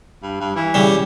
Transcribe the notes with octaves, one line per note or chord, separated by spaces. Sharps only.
G2
G2
E3
C#3 G3